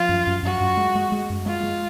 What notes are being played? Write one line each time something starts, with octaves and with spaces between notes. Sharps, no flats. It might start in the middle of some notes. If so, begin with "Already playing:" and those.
Already playing: F3 F4
F#2
F#2
F#2 F#4
F#2
G#3
G#3
G#3
F#2
G#3 F4
G#3